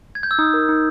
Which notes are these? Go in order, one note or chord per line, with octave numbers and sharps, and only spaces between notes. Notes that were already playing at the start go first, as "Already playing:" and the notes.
G#6
G6
E6
D#4 D#6
A#4
D#4